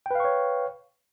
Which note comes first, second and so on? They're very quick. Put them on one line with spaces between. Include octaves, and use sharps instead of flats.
G5 B4 F5 C#6 C#5